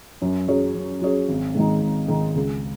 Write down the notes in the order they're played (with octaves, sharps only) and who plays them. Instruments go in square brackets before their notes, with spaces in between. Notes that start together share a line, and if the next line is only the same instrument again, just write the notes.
[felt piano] F#2
F#3 C#4 G#4 C#5
F#2
F#3 C#4 G#4 C#5
G#1
G#2 D#3 G#3 D#4
G#1
G#2 D#3 G#3 D#4
C#2